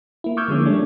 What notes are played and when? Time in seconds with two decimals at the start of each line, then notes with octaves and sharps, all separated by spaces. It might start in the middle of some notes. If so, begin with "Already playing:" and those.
0.24 A#3 E4
0.37 C#6 D6 E6 F6 G6 G#6
0.48 D3 F3 G#3 A#3 C#4
0.66 G3 A3 C#4 D4